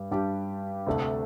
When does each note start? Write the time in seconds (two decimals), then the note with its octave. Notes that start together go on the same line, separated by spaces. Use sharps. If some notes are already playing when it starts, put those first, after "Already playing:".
Already playing: G2 G3
0.11 G2 G3 D4 G4
0.87 D2 C3 A3 D4